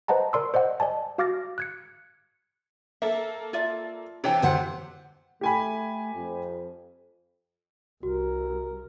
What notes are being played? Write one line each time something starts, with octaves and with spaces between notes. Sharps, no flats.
B4 C5 D#5 F#5 A5 A#5
A#4 D5 C6 E6
C5 D5 D#5 F#5
D5 D#5 G#5 A5
F#4 F5 D6 F6 A6 A#6
F#6 G#6 C#7
A#3 A4 E5
F4 D5 E5
C3 E3 C#5 G5 A5
D2 C5 F#5
A3 G4 G#5 B5
F2
C2 F#4 A#4